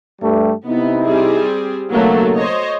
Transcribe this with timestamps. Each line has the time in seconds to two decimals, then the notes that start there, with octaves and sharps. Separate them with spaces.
0.21 G2 G3 A3
0.67 C3 B3 D#4 E4
1.04 G3 C4 G#4
1.92 B1 C#3 F#3 A3 A#3 A4
2.35 C5 C#5 D#5